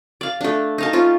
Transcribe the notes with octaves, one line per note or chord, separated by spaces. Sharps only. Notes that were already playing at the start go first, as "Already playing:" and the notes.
D5 F5
A3 D4
D#4 F5 A5
C#4 F4